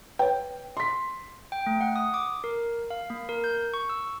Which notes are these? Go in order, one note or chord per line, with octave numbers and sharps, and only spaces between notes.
B4 C#5 G5
C6 B6
G5
A3
F#5
D#6
D6
A#4
F5
A#3
A#4
G6
C#6
E6